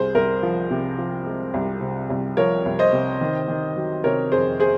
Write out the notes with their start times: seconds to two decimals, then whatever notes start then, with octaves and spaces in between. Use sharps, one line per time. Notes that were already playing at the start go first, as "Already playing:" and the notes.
Already playing: C2 G#4 C5
0.15 C2 A#4
0.43 F3
0.71 C3
0.99 F3
1.26 G#3
1.54 C2
1.81 C3
2.10 C2
2.37 F3 A#4 C#5
2.66 C2
2.79 C5 D#5
2.93 C3
3.21 D#3
3.48 D#3
3.76 F#3
4.04 C3 A#4 C#5
4.32 F2 G#4 C5
4.60 G#4 C5